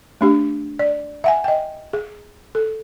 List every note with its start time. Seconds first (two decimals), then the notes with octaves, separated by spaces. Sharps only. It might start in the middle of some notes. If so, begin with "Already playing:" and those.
0.21 A3 D4 G4
0.79 D5
1.24 E5 F#5 G#5
1.44 D#5 G5
1.93 G#4
2.55 A4